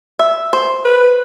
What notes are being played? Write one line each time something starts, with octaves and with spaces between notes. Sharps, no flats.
E5
C5
B4